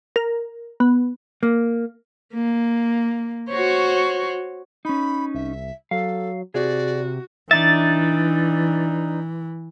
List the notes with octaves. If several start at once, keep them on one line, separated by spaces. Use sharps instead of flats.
A#4
B3
A#3
A#3
F#4 C5 C#5
C#4 D#4 B5
C2 E5
F#3 A4 F5
C3 F#4 G#4 D5
E3 D4 D#4 E5 A6